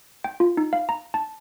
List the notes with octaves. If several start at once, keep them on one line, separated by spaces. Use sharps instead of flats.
G5
F4
D#4
F5
A#5
A5